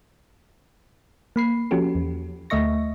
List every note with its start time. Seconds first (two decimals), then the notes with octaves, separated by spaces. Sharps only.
1.36 A#3 B5 C7
1.71 F3 C#4 F#4 G4 A4
1.95 E2
2.50 D2 A3 D#5 E5 C#6 A#6